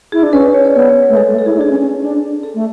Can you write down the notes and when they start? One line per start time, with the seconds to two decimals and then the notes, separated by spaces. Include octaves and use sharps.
0.12 E4 G#4
0.23 D4
0.33 C#4 B4
0.43 B4
0.54 C#5
0.65 D5
0.75 B3 C#5
0.89 C#5
1.03 B4
1.09 A3
1.17 G#3 A4
1.31 A3
1.39 A4
1.45 E4 G#4
1.55 E4
1.59 D4 G#4
1.70 C#4
1.81 C#4
2.02 D4
2.43 A4
2.55 A3